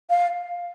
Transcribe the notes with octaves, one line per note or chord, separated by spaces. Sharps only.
F5